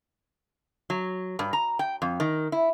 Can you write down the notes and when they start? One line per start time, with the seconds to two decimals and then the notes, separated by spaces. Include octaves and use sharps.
0.90 F#3
1.39 G2
1.53 A#5
1.79 G5
2.02 F2
2.20 D#3
2.52 E4